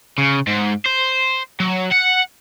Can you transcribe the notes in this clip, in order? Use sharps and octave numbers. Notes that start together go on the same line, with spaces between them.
C#3
G#2
C5
F#3
F#5